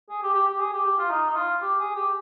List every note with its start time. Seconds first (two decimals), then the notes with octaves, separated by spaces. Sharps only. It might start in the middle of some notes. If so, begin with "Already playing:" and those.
0.09 G#4
0.22 G4
0.34 G4
0.47 G4
0.60 G#4
0.73 G4
0.85 G4
0.99 F4
1.10 D#4
1.30 D#4
1.36 F4
1.62 G4
1.79 G#4
1.95 G4